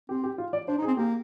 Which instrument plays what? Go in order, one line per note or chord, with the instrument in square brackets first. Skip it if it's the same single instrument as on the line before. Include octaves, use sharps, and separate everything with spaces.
[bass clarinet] C4 [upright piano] G4
[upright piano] G4
F4
D5
[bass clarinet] D4 [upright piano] C5
[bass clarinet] D#4
[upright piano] G#4
[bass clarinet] C4
[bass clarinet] A#3 [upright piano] G4